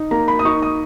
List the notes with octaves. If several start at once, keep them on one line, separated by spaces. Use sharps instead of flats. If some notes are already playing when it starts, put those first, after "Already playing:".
Already playing: D#4
A#3 A#5
B5
D#6
D#4 C#6
D#6